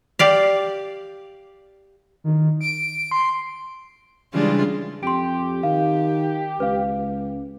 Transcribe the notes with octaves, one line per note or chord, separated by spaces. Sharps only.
G4 D5 F5
D#3
D7
C6
C#3 E3 G3 G#3 D4 F4
F2 G4 C6 D7
D#3 F5
C#2 B4 F5